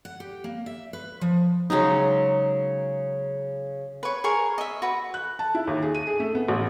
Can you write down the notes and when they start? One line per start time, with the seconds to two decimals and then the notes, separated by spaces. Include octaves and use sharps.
0.05 F#5
0.20 G4
0.44 A#3
0.66 E5
0.93 B4
1.21 F3
1.70 C#3 F#3 G#3 D#4
4.03 B4 C#5
4.24 G#4 A#4 C#6
4.58 D#5 E5
4.82 F#4 B4
5.14 F#6
5.39 A5
5.55 E4
5.67 D#2
5.82 G#4
5.95 D#7
6.07 G#4
6.20 A3
6.35 B3
6.48 A1